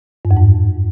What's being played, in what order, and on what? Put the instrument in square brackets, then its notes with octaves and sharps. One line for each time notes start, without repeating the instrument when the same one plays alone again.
[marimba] G2
F2
G#2